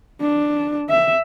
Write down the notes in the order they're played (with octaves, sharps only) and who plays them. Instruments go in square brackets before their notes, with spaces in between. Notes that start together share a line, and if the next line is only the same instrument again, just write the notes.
[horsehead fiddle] D4
E5